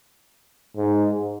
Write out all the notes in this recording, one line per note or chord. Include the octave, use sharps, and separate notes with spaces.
G#2